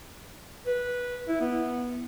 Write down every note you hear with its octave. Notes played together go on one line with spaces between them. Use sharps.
B4
E4
B3